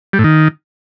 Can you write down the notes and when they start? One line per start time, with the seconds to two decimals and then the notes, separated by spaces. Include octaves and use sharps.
0.13 G3
0.19 A2
0.24 D#3